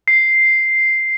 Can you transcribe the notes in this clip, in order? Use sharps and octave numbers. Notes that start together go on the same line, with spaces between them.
C7